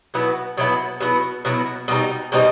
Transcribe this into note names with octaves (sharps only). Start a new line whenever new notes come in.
B2 F#3 B3 E4
B2 F#3 B3 E4
B2 F#3 B3 E4
B2 F#3 B3 E4
B2 G3 C4 D#4
B2 G3 C4 D#4